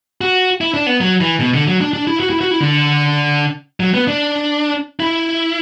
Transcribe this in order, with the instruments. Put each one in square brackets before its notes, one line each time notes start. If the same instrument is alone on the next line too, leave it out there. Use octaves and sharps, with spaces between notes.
[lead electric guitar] F#4
E4
D4
B3
F#3
E3
B2
D3
F#3
D4
D4
E4
F#4
E4
F#4
E4
D3
F#3
B3
D4
E4